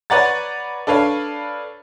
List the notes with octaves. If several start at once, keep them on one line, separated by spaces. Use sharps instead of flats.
B4 C#5 D5 F#5 A#5 A6
D4 A4 B4 C#5 F5